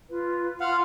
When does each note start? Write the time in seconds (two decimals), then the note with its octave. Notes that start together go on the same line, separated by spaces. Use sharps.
0.08 F4 B4
0.60 F4 F5 F#5 C6 F6